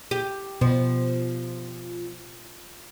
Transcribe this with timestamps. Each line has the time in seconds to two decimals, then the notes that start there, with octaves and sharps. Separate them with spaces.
0.11 G4
0.61 B2 F3